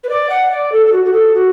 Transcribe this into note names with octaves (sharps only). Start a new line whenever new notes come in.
B4
D5
F#5
D5
A4
A4
F#4
F#4
A4
F#4